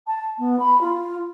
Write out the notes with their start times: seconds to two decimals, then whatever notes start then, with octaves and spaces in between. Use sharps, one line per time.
0.07 A5
0.38 B3
0.59 B5
0.81 F4